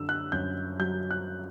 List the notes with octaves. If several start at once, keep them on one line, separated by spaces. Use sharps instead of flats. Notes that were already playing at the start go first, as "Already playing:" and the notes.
Already playing: F#2 D3 E6
F#6
F#2 G6
F#3 G6
F#6